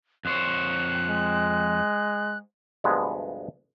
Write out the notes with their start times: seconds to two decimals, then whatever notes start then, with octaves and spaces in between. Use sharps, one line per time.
0.25 F2 C5 C#5 F#6
1.09 G#3
2.84 D2 G2 C3 F3 G#3 B3